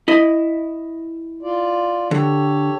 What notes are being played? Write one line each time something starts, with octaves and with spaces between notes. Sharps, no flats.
E4 D#5
F4 D5
D3 G4 A4 C#5